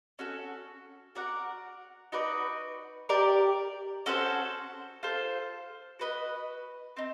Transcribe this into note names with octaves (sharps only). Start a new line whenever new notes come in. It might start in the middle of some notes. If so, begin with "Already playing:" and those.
C#4 F#4 A4
F#4 A#4 D5 F#5
D#4 F#4 B4 D5
G4 A#4 D5
C#4 F#4 A4 C5
F4 A4 C5
F#4 B4 D#5
C4 D#4